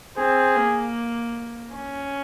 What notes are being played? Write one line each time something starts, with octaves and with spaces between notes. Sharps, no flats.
C4 G#4
A#3
C#4